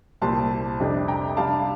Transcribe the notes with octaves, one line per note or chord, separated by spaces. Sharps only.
C2 A#2 G3 C4 A5 C6
F2 C3 G3 D4
G5 A#5
C3 G3 D4 F5 A5